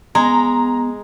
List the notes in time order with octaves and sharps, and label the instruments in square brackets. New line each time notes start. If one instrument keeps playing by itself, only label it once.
[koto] G#3 [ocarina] B3 [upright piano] A#5